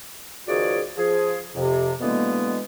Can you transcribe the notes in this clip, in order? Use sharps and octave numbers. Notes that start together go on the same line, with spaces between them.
C#2 D#3 F3 F#4 G#4 D5
F3 G#4
F2 C3
B2 D3 E3 G#3 A#3 B3